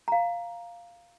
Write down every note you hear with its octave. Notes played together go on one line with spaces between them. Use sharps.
F5 A#5